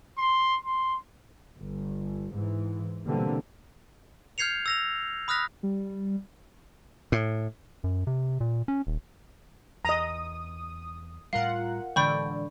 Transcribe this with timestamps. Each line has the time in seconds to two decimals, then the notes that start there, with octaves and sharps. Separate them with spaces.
0.18 C6
0.64 C6
1.58 G1
2.31 G#2 E3
3.05 B2 D3 E3 G3 A#3 C4
4.38 F6 G6 G#6 C7 C#7 F7
4.66 E6 A#6 F7
5.28 B5 D#6 F6 F#6 A#6 B6
5.63 G3
7.12 A2
7.84 F#2
8.07 C3
8.40 A#2
8.68 C#4
8.87 D#1
9.85 E2 D#5 A#5 D#6
11.33 A2 G3 F4 A#4 F5 F#5
11.96 A2 D3 E3 G#3 D5 G5 B5 C#6